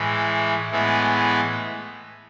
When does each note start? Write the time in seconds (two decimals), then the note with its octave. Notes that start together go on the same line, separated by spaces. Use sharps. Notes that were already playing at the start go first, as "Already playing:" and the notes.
Already playing: A2 E3 G#3
0.71 A2 E3 G#3 B3